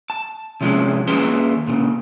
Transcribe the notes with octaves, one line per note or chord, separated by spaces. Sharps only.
A5
C3 F3 G3 G#3 C#4
D#2 C#4 G#4 B4 A5 C6
A#2 C#3